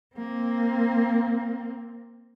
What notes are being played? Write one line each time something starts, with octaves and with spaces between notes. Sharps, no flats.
A#3 C4